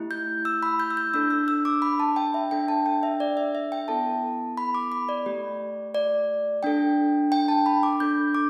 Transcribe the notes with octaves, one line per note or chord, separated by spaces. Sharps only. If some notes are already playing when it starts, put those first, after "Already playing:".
Already playing: A3 E4 G4
G6
E6
B5
G6
E6
G6
D4 A4 E6
E6
E6
D6
B5
A5
G5
E5
D4 A4 G5
A5
G5
E5
D5
E5
E5
G5
B3 E4 A4 A5
B5
D6
B5
D5
A3 G4
D5
D4 A4 G5
G5
A5
B5
D6
D4 A4 G6
D6